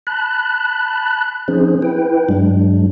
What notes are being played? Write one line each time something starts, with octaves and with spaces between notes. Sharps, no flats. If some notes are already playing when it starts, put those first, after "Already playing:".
A5 B5 F#6
F3 C4 C#4 D#4 G#4 C5
E4 B4 G5
G2 F#3 G#3 D4